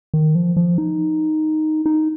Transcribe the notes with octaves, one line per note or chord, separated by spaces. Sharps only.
D#3
F3
F3
D#4
D#4